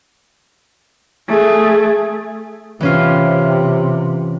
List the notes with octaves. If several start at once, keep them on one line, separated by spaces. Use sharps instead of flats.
A3 G#4
C3 E3 C#4 F4